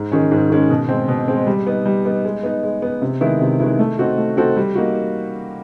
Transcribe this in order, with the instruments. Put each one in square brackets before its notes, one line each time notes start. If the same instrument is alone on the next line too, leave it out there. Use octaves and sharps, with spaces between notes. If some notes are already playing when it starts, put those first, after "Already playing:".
Already playing: [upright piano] G#2
D#3 G#3 C#4
G#2
D#3 G#3 C#4
B2
G#3 C4
B2
G#3 C4
G3
B3 D#4
G3
B3 D#4
G#3
B3 D#4
G#3
B3 D#4
C3
D#3 G#3 B3 E4
C3
D#3 G#3 B3 E4
A3
C4 D#4 F#4 A4
A3
C4 D#4 F#4 A4
G3
A#3 D#4 F#4